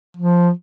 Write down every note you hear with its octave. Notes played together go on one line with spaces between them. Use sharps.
F3